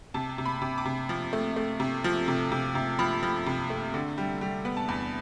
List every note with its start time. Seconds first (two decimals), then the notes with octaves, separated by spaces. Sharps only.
0.14 C3 A5
0.38 C3
0.46 B5
0.62 C3
0.78 D6
0.85 C3
1.09 F3
1.33 A3
1.56 A3
1.80 C3
2.04 F3
2.28 C3
2.52 C3
2.75 C3
2.99 F3 B5
3.23 F3
3.46 C3
3.70 A3
3.94 D3
4.18 G3
4.41 G3
4.65 B3
4.77 A5
4.88 E2 B5